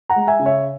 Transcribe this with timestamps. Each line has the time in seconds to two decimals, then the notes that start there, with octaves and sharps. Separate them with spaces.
0.10 F#5 A#5
0.16 G#3
0.27 E5 G#5
0.39 C#3
0.46 C#5 E5